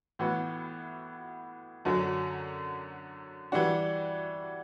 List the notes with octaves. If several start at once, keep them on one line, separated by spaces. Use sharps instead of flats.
A2 E3 B3 F#4
F#2 D3 F#3
E3 G3 D4 F#4